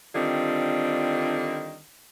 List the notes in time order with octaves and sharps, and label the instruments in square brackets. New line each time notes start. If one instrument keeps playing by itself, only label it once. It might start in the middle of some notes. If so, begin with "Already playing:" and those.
[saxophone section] D3 D#3 G3 C4 F4